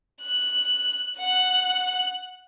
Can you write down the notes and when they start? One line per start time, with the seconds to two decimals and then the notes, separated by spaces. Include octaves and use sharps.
0.22 F#6
1.18 F#5 F#6